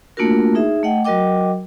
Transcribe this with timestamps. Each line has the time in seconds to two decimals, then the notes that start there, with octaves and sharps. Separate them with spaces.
0.17 A3 A#3 D4 F4 F#4 A#4
0.55 D#4 G#4 E5
0.83 A3 D#5 F#5 G5
1.05 F#3 F#4 A#4 D#5 G5 D6